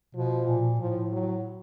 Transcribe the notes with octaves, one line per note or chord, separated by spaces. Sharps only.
B2 F3
A#2
A2 F3
F#3